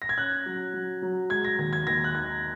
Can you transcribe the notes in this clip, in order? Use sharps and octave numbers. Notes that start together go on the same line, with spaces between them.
A#6
G#6
C#4 F#6
F#3
F#3
F#3
G#3 G#6
A#6
D#2 G#6
G#6
D#2 A#6
F#6
D#3 G#6